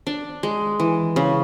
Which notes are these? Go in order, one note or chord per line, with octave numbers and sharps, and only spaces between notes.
D4
G#3
E3
C#3